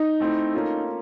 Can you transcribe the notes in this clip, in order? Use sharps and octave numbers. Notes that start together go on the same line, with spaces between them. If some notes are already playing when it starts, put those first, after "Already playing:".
Already playing: D#4
A3 C4 E4
A#3 C#4 F4 A4